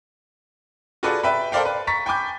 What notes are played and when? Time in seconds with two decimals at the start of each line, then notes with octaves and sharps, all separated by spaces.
1.03 F4 F#4 G#4 A4 B4 D5
1.23 B4 E5 G5 B5
1.52 A4 A#4 C5 D5 F5 G5
1.65 B4
1.87 A#5 C#6 A6 B6
2.06 G5 G#5 B5 D6 G6